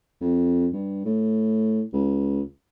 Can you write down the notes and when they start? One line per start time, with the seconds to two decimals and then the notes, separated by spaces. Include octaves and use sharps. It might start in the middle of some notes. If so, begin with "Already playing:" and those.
0.21 F2
0.72 G2
1.05 A2
1.93 C#2